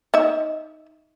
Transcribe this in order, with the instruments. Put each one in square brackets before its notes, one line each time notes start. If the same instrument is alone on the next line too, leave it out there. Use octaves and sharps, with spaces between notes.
[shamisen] D#4 E5